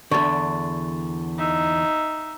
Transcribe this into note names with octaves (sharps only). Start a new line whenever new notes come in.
E2 D3 C#6 A6
D#4 E5